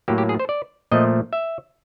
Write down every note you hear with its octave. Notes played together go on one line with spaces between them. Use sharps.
A2 F#3 A#3 G4
G4
G#4
C5
D5
A#2 F3 A3 D#5
E5